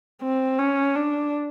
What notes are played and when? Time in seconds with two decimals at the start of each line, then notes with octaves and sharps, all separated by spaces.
0.22 C4
0.58 C#4
0.95 D4